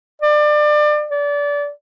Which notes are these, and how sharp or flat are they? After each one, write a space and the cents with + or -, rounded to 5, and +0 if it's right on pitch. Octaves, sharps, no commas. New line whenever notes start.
D5 +30
D5 -25